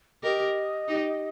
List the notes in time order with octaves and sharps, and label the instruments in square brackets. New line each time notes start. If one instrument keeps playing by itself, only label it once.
[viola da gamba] G4 A#4 [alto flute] D#5
[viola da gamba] D#4 G4